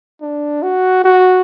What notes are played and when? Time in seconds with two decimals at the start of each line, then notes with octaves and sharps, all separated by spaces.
0.21 D4
0.63 F#4
1.04 F#4